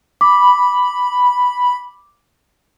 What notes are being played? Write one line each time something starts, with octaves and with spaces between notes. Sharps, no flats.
B5 D6